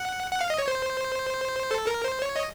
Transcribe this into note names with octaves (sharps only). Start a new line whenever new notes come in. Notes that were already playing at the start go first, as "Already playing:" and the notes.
Already playing: F#5
F#5
F5
D#5
C#5
C5
A4
A#4
C5
C#5
D#5